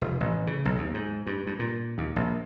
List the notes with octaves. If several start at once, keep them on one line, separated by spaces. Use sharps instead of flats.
F1
A1
C#3
B1
D#2
G#2
G2
G2
A#2
D#2
A#1